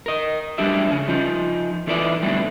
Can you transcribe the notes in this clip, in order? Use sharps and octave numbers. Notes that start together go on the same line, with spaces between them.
A#4 D#5
F#3 G3 A3 D4 G4 E5
C#3 C#4
F3 D#4
E3 D#4 A4 B4 D5 E5
B2 D3 F#3 G3 A3 C4